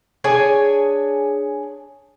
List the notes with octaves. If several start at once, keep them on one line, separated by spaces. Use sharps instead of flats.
D4 G#4 C#5 G#5